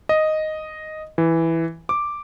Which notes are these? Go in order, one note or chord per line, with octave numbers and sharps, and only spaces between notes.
D#5
E3
D6